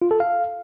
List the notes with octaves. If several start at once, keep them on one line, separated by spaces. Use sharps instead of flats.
F4
A4
F5